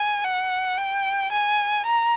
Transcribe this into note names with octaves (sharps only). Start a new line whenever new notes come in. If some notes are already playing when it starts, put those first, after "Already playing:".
Already playing: G#5
F#5
G5
G#5
A#5